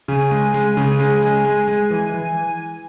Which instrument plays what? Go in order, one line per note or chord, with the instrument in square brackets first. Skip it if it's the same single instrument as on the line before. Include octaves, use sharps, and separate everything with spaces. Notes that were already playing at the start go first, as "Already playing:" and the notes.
[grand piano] C#3 [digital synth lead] G#5
[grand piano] G#3
G#3
C#3
G#3
G#3
G#3
G#3
E3
E3